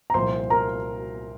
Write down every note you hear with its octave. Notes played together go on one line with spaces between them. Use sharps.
A#5
C2 A#2 F3 C5 C6
A#4 A#5